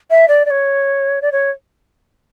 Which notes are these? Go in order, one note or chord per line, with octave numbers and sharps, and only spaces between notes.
E5
D5
D5
C#5
D5
C#5